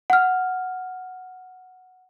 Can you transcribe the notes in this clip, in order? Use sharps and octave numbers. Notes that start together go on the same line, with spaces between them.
F#5 F6